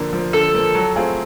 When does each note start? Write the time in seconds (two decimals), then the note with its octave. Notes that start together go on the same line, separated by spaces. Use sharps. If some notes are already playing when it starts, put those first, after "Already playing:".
Already playing: D3 F3 A#3
0.13 F3 A#3
0.33 D3 A4
0.54 F3 A#3
0.75 F#3
0.95 A3 C4 F4 G#4